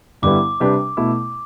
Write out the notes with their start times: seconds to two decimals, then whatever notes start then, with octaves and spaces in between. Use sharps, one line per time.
0.22 G2 D3 G3 B3 E4 D6
0.60 C3 G3 D4 G4 B4
0.97 B2 A3 E4